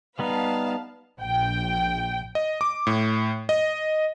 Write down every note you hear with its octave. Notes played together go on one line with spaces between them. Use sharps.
G3 B3 D#4 B4 F5 A5
A#1 G5
D#5
D6
A2
D#5